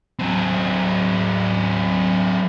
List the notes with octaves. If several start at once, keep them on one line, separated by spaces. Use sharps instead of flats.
F#3 C4